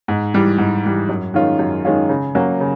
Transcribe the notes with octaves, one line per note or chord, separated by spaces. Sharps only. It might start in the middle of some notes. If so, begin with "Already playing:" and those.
G#2
E3 G3
G#2
E3 G3
F#2
D#3 G#3 C#4 F4
F#2
D#3 G#3 C#4 F4
C#3
F#3 A#3 C#4
C#3